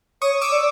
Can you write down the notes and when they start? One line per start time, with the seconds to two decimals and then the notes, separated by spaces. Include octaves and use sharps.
0.21 C#5 C#6 D#6
0.42 D6 E6
0.51 D5